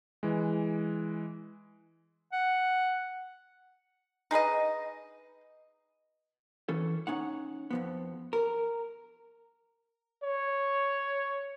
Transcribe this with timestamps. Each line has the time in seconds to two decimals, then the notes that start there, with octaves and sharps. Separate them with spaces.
0.23 E3 G#3
2.33 F#5
4.31 D#4 G#4 B4 D#5
6.69 E3 C#4 A4
7.07 C#4 D#4 F#5
7.71 F2 F3 B3
8.33 A#4
10.23 C#5